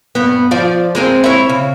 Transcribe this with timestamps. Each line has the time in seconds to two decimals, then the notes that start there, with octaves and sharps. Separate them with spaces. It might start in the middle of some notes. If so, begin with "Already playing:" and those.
0.15 G2 B3
0.51 F3 F4 D5
0.95 G#3 C4 A#4
1.24 E4 C#5
1.49 C#3